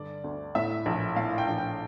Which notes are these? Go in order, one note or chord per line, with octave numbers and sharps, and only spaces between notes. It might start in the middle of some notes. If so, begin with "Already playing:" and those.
Already playing: G2 D3 D5
D2
A2 E5
A#1
A2 F5
G5
A#1
G5